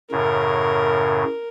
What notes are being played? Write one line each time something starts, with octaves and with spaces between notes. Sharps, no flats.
F#2 A2 C#3 A#4